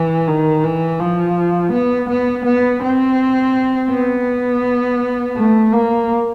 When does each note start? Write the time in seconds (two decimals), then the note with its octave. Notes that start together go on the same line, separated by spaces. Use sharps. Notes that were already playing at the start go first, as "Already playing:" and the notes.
Already playing: E3
0.27 D#3
0.64 E3
1.00 F3
1.72 B3
2.09 B3
2.45 B3
2.82 C4
3.91 B3
5.37 A3
5.73 A#3